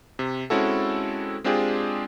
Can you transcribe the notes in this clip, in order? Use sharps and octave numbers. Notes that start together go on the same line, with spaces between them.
C3
G#3 C4 C#4 E4 F#4 A4
G#3 C4 D4 F4 G4 G#4